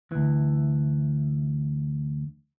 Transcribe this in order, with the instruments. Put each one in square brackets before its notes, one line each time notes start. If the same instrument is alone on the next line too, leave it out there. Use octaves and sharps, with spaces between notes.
[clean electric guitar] D2 E3